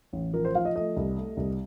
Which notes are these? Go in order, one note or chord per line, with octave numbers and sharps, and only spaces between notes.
A1
F3 A#4
C5
F3 F5
D#5
A3 D#5
C2
A3
C2